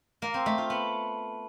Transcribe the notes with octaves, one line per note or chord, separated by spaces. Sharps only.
A#3
C4
A3
F4
B3